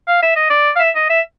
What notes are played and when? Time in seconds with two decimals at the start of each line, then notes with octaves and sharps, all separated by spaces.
0.08 F5
0.23 E5
0.36 D#5
0.50 D5
0.76 F5
0.80 E5
0.95 D#5
1.10 E5